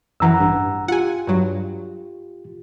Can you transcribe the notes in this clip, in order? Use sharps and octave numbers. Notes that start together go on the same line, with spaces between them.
F#2 E3 F#5 A#5 E6
A1 G2
F4 G4 F#5 G#5
G2 F#3